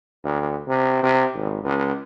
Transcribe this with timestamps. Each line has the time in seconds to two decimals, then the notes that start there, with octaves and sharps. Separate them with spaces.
0.24 D2
0.68 C3
1.03 C3
1.35 G#1
1.64 C#2